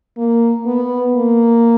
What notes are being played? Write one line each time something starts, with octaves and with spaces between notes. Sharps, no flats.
A#3
B3
A#3